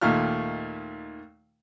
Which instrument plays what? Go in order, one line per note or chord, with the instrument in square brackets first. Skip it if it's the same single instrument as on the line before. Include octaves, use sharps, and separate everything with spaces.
[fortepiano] D#2 A#2 D#3 A3 F4 F6